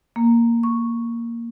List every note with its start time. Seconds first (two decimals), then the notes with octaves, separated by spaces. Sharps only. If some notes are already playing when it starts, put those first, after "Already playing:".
0.16 A#3
0.63 C#6